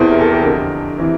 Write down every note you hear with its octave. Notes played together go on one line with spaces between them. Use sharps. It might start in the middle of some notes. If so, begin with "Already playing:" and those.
Already playing: E2 C3 E3 A4 C5
A#4
A4
G4 A#4
F2 D3
C3 E3